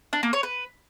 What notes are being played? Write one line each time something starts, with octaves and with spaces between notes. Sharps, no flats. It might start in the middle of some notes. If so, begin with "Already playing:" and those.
D4
A#3
C#5
B4